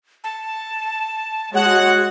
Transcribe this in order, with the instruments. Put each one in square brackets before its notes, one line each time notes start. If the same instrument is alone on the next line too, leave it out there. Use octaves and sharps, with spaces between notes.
[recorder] A5
[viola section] G#3 F#4 [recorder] C#5 [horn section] F#5